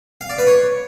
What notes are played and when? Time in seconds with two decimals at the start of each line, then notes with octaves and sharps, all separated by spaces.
0.21 F5
0.30 D5
0.38 B4
0.47 C#5